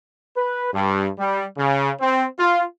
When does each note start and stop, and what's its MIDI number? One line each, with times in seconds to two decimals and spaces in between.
0.37 0.70 71
0.74 1.08 43
1.19 1.44 55
1.57 1.91 49
2.01 2.26 60
2.39 2.63 65